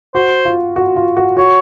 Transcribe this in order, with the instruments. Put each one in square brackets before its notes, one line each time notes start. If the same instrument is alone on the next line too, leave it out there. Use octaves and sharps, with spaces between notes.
[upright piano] F#4 [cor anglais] C5
[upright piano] F4
F#4
F4
F#4
[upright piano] F#4 [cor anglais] C#5